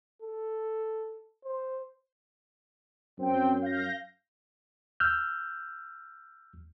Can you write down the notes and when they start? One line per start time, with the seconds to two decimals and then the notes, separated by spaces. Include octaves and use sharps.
0.22 A4
1.45 C5
3.19 F#2 C4 G5
3.62 F5 G6 A#6
5.00 E6 F6 G6